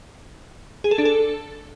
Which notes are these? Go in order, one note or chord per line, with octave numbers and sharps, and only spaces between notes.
G#4
A4
D4
A4